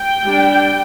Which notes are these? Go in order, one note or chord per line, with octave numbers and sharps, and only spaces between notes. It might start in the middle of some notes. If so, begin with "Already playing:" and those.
Already playing: G5
G3 D4